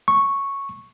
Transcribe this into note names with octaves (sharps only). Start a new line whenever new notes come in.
C#6